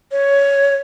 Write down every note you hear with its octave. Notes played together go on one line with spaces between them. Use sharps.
C#5